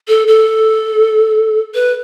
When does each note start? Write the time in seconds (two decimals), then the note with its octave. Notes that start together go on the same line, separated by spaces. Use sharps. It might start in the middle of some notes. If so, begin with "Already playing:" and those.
0.08 A4
0.28 A4
1.75 B4